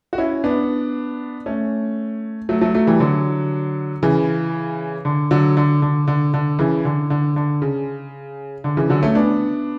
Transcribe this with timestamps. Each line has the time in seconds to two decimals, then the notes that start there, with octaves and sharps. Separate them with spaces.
0.13 F#4
0.18 C#4 E4
0.44 B3 D4
1.46 A3 C#4
2.49 F#3 A3
2.61 F#3 A3
2.75 F#3 A3
2.87 E3 G3
3.00 D3 F#3
4.03 C#3 E3
5.05 D3
5.31 D3 F#3
5.57 D3
5.82 D3
6.08 D3
6.34 D3
6.59 C#3 E3
6.85 D3
7.10 D3
7.36 D3
7.62 C#3
8.64 D3
8.77 C#3 E3
8.90 D3 F#3
9.03 A3 C#4
9.15 B3 D4